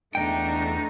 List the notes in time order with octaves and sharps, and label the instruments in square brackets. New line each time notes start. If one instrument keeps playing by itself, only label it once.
[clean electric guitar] E2 G#2 G5 [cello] A3 D#4 [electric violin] D4